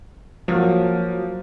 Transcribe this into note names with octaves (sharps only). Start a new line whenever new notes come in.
F3 F#3 A#3 F#4